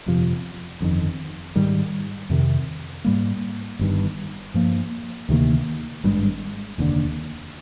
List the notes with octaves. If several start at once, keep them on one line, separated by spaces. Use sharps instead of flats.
G1 F2 C3 F3
G1 F2 D#3
G#2 D#3 G3
F2 C3 D#3
G#2 G3 A#3
G1 G2 D#3
G2 F3 A#3
D2 C3 D#3 A#3
G#1 G2 D3 G#3
F1 D#2 D3